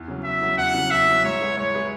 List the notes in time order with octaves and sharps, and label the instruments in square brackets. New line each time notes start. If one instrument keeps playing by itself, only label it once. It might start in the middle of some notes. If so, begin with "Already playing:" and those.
Already playing: [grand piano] E2
C#3 F#3
[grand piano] E2 [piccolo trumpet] E5
[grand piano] C#3 F#3
[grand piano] E2 [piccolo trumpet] F#5
[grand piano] C#3 F#3
[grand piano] E2 [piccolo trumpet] E5
[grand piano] C#3 F#3
[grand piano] G#2 [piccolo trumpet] C#5
[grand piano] G#3 E4 G#4 B4
[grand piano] G#2 [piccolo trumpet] C#5
[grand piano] G#3 E4 G#4 B4